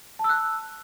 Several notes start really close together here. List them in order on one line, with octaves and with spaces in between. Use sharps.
A5 E6 F#6